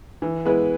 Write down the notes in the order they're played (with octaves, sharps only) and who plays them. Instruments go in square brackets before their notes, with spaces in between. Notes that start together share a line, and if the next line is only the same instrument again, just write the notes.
[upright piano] E3
G#3 B3 E4 B4